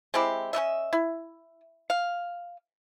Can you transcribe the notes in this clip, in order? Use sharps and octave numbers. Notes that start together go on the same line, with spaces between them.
G#3 C4 E4 G4
C#4 D#4 D#5 E5
E4
F5